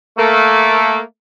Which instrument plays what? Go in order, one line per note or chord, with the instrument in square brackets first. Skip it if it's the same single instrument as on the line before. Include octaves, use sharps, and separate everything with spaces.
[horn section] A3 A#3